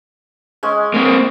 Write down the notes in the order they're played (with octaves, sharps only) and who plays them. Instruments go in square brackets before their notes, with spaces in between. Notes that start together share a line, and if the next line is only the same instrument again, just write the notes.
[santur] G#3 C#4 G#5
[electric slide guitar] A#3 C4